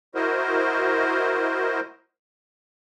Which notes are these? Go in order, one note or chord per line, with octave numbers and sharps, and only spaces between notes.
E4 F#4 A#4 C5 D#5